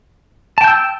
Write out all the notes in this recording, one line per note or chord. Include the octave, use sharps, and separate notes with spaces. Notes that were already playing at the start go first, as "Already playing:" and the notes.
G5 A5 E6 G6